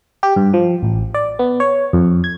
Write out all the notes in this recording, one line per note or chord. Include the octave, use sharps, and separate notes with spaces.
G4
G2
F3
A1
D5
B3
C#5
F2
G#6